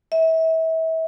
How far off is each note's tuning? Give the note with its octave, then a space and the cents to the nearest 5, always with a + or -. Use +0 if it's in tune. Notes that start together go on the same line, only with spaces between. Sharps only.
E5 -30